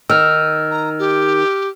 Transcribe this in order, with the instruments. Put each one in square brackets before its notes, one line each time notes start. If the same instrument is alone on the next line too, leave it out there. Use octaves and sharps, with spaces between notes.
[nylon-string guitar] D#3 [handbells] E6 F6
[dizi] A#5
G4